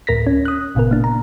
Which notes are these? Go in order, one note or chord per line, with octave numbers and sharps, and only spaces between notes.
D2 A2 A#4 A#6 B6
C#4
D#6 F#6
G1 A#2 C#3 B3 A#4
A#3 D4
A#5